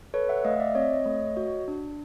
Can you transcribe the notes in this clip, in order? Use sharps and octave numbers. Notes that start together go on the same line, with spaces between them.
A4 B4 C#5
E5 F#5
A3 D#5 F5
D5 E5
C4 C#5 D#5
A3
F#4
D4